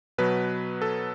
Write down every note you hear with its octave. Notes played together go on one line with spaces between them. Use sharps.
B2 F#3 B4
A4